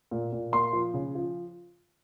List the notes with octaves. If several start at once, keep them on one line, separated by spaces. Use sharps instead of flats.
A#2
A#2
A#3 C6
F3
C#3
F3